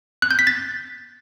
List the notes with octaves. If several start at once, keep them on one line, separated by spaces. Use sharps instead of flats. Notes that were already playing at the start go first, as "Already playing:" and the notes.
F#6
G6
B6
A6